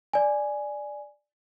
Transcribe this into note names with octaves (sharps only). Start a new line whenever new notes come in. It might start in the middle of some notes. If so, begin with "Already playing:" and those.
D5 G#5